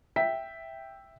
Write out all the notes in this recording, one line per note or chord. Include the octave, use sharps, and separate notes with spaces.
E5 G5 B6